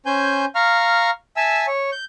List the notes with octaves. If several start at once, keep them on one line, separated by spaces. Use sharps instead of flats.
C#4 C5 G#5 G6
F5 A#5 C#6 F6
E5 G#5 A5 E6
C#5
G6